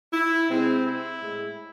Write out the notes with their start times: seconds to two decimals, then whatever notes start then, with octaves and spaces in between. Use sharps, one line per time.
0.14 E4
0.50 C3 G#3 C4
0.86 E4
1.21 A2 G#3